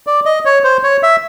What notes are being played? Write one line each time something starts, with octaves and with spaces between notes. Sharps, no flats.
D5
D#5
C#5
C5
C#5
E5